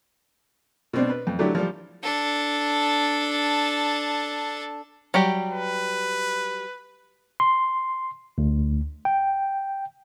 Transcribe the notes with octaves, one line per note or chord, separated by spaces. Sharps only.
B2 C4 D4
B4
F2
D3 F#3 A3 D4 E4 G4
F3 G3
D4 A4
F#3 G3 G4
B4
C6
D2
G5